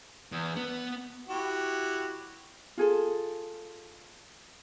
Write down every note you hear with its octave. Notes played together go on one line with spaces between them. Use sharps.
E2
B3
E4 F#4 G4
F4 G#4 A4